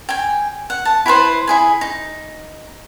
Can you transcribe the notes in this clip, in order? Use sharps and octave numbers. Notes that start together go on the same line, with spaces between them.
G5 G#5
F#5
A5
E4 G4 B4 C5
E4 G#4 G#5
D#4